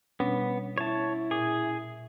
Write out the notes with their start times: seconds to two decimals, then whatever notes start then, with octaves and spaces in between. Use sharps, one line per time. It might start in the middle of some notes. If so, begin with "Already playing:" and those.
0.20 B2 G3 B3 C#4 D4
0.78 E4 C#5 A5
1.31 A#2 G#4